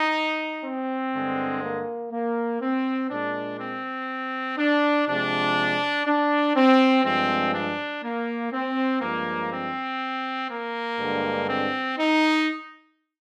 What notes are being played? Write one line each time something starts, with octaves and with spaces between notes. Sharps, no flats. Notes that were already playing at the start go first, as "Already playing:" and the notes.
Already playing: D#4
C4
G2 D3 G#3
A#3
A#3
C4
A#2 G#3 D4
C4
D4
C3 F3 G#3 D4
D4
C4
G2 F3 G#3 C4
D4
A#3
C4
G2 F3 G#3 A#3
C4
A#3
G2 D3 G#3
C4
D#4